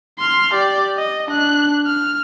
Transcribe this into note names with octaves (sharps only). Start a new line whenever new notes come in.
C6 F6
G4 D5
D#5
D4 F#6
F6